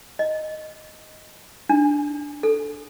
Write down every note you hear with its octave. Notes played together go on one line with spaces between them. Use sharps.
D#5
D4
A4